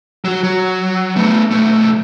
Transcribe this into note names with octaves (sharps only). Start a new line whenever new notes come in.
F#3 F#4
F#3
A3 B3
B1 A3